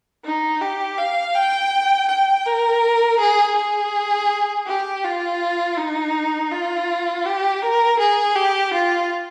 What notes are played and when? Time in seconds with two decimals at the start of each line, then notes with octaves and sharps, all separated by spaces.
0.24 D#4
0.61 G4
0.98 F5
1.34 G5
2.08 G5
2.46 A#4
3.19 G#4
3.55 G#4
4.66 G4
5.04 F4
5.77 D#4
6.51 F4
7.25 G4
7.62 A#4
7.99 G#4
8.35 G4
8.73 F4